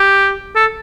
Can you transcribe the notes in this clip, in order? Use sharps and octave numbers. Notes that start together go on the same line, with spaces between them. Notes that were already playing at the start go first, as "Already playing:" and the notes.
Already playing: G4
A4